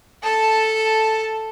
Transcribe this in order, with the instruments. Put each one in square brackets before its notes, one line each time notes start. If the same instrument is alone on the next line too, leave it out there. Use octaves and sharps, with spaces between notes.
[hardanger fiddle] A4 A5